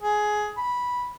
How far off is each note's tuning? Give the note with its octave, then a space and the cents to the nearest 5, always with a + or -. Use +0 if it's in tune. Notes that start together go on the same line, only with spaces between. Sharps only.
G#4 +15
B5 -10